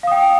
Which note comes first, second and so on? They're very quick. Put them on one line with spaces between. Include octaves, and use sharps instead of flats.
F5 D#6 G5